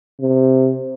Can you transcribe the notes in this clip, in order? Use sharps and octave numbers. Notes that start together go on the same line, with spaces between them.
C3